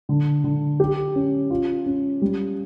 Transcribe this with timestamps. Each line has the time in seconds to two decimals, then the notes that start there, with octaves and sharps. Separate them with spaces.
0.09 D3
0.44 D3
0.80 G4
1.15 C#4
1.51 F4
1.86 C#4
2.22 G3